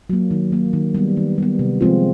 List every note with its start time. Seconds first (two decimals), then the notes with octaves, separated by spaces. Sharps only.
0.10 F#3 A#3
0.31 D#3
0.52 F#3 A#3
0.73 D#3
0.94 G3 B3
1.17 D#3
1.38 G3 B3
1.59 C3
1.81 F3 G#3 C4 F4